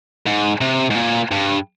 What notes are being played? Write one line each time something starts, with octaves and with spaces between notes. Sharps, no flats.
G#2
C3
G#2
A#2
G2